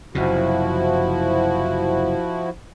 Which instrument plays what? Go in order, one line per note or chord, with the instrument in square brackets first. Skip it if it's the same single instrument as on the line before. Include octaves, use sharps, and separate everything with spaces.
[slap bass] F#1 F#2 C3 [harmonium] F3 E4 F#4